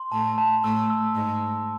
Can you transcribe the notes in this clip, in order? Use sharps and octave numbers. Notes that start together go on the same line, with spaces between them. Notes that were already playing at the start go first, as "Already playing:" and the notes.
Already playing: C6
A2 A3 A5
A5
A2 A3 E6
E6
G#2 G#3 E6
E6